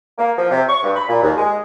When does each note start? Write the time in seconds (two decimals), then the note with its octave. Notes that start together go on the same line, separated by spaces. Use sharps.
0.19 A#3
0.38 F3
0.51 C3
0.69 C#6
0.84 G2
0.96 B5
1.09 A#2
1.23 D#2
1.37 G#3